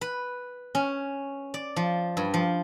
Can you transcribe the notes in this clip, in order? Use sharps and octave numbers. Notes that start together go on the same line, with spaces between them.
B4
C#4
D5
F3
G2
F3